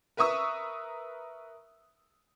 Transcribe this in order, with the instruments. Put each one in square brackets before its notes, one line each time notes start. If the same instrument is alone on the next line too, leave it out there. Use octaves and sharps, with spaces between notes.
[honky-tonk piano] A#4 B4 E5 C#6 D#6 E6